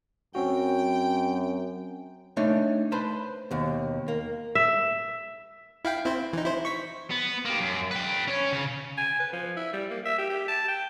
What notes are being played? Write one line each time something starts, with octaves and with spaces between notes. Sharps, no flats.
F#2 C4 C#4 F#4 G5
A3 D4 D#4 C#5
B4 C5 A5 B5 C6
D#2 B2
A#3
E5
E4 F5 G5
C4 E4 C5
E3 D#4
E4 C5
C#6 B6
B3
A#3 G4
F#2
B4 G5
C#4 C#5
C#3
G#5
B4
F3
E4
G3
A#3
E5
G4
G4
A5
G5